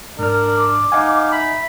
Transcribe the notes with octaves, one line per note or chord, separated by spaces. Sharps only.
G#2 D4 A#4 D5 F6
D6
D#4 D#5 F5 F#5 G#5
E5 B5